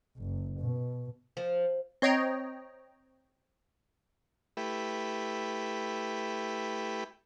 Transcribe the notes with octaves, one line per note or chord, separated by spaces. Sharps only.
F#1
B2
F3
C4 C#5 D#5 G5 A#5
A3 E4 G4 B4